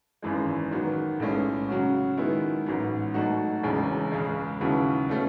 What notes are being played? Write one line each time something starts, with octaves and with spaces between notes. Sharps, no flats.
G#1 F#2 E3 G#3
D#3 F#3 B3
B1 A2 G#3 C#4
C#3 F#3 C#4 F#4
D#3 G#3 B3 E4
A1 G#2 F#3
B2 F#3 A3 D#4 F#4
E1 E2 C#3 G#3 C#4
C#2 C#3 G#3
D#2 C#3 F#3 B3 E4
B2 A3 C#4